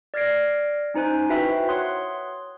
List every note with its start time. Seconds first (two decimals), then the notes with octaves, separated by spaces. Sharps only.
0.14 D5 F6 G#6 A#6 C7 D7
0.94 C#4 D#4 C5 G#5 F#6
1.29 E4 F#4 B4 E5 G5 B5
1.69 C#5 F#5 C6 D#6 F#6